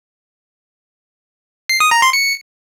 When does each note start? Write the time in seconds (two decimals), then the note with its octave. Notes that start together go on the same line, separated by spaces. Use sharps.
1.69 C7
1.80 D#6
1.91 A#5
2.02 C6
2.13 C#7